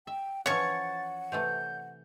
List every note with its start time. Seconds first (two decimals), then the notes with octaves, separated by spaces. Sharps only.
0.07 E5 G5
0.46 E3 F3 C#4 C#5 F#5 C#6 A6
1.32 C3 E3 A3 G6